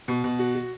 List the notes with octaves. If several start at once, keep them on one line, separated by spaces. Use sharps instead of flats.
B2
B2
F#4
F#4